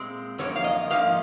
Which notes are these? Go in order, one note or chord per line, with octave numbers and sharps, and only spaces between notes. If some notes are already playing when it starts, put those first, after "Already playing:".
Already playing: A#2 G#3 C4
F#2 F3 A#3 C#5
F5
D#5
G#2 F3 A#3 F5